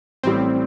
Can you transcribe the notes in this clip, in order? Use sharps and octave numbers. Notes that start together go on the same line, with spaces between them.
A1 A2 G3 C4